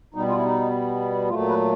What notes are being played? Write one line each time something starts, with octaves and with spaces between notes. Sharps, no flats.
B2 G3 B3 D#4
F4
E4
D#4
A#2 F#3 A3 F4
B4